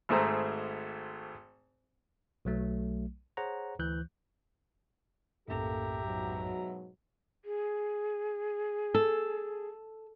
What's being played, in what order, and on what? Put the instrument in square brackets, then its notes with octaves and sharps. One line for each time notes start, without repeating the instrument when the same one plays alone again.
[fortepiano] G#1 G#2 A3 G#4 C5 A#5
[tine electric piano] B1 F#3 A3
G#4 C5 C#5 F#5 A#5
D2 E3 F#6 G6
[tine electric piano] B1 F#2 A2 [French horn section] A#3 A4 [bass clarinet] G4 [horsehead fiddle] E5 A#5
[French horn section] G#2 B2 F#3
[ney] G#4
[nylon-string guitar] A4